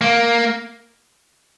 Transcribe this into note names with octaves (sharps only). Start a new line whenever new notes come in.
A#3